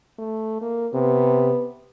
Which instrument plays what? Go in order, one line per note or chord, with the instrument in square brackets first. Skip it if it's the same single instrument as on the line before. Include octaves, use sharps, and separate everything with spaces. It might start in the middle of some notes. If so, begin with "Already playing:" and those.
[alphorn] A3
A#3
[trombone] C3 [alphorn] B3